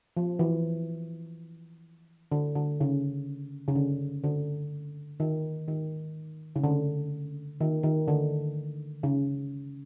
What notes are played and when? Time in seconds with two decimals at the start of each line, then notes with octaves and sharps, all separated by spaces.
0.17 F3
0.39 E3
2.32 D3
2.55 D3
2.80 C#3
3.68 C#3
3.75 D3
4.24 D3
5.20 D#3
5.68 D#3
6.56 C#3
6.64 D3
7.61 D#3
7.83 D#3
8.08 D3
9.03 C#3